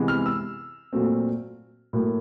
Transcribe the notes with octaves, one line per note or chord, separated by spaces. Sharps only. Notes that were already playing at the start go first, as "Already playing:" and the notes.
Already playing: C3 E3 G#3 B3
F6
E6
A#2 F#3 A3 C4
A2 F#3 A#3